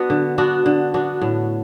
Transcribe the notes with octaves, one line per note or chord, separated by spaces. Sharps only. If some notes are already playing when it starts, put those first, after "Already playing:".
Already playing: B3 D4 F#4
D3
B3 D4 F#4
D3
B3 D4 F#4
A2